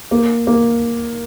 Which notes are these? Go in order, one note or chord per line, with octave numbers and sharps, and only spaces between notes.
A#3
A#3